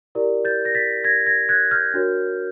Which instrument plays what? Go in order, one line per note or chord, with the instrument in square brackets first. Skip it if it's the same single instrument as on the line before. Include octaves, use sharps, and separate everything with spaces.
[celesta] E4 G4 A#4 D5
G6 A6
A#6
A6 B6
G#6 A#6
G#6 A#6
F#6 G#6
F6 G6
D4 F#4 A#4 C#5